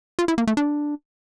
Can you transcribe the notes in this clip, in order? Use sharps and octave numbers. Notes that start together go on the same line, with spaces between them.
F4
E4
A#3
A3
D4